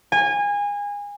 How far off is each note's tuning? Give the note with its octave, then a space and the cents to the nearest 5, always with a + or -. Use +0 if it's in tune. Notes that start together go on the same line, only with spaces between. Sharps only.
G#5 -25